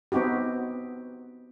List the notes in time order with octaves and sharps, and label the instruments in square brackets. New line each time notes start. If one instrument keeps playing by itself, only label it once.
[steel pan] B3 C4 D#4 F#4 G4